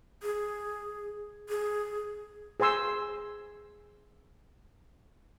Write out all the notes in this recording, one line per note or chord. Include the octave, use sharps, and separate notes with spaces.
G#4
G#4
G#4 C5 G#5 C6 E6